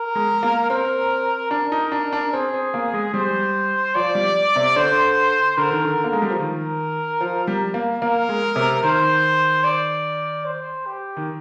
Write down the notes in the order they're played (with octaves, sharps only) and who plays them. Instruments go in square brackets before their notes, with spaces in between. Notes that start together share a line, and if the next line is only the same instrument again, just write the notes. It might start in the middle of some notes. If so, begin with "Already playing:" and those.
Already playing: [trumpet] A#4
[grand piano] G#3
A#3
[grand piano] C4 [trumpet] A#4
[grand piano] D4 [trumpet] A#4
[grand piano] D#4
D4
D4
[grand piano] C4 [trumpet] G#4
[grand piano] C4
A#3
G#3
[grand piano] G3 [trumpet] C5
[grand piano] F3 [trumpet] D5
[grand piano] G3
C3
[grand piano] D3 [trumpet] C5
[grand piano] D3 [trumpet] A#4
[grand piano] D#3
D3
A#3
G#3
G3
F3
[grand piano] D#3 [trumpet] A#4
[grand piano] F3
G3
A#3
[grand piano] A#3 [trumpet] A#4
[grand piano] G#3
C3
[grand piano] D#3 [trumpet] C5
[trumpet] D5
C5
G4
[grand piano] D#3